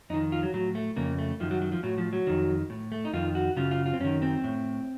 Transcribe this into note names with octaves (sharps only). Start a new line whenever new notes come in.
F2 D#3 D#4
F4
F#3
A2 F#3
A3
F2 C#3 A#3
A3
F#2 D#3 F3
F#3
F#3
F3
A2 F#3
F3
F#3
F2 D#3
A2
A3
D#4
F2 D#3 F4
F#4
F#2 C#3 F4
F4
F4
C4
F#2 D#3 C#4
C4
A2